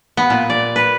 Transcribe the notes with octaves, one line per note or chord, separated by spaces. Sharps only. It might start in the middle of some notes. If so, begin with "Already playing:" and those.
B3
A#2
D5
B4